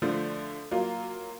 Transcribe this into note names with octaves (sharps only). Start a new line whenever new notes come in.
D3 F3 A3
F#3 A#3 F4